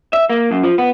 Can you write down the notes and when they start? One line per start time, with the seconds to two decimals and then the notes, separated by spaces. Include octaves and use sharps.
0.13 E5
0.30 A#3
0.51 F#2
0.63 F3
0.78 B3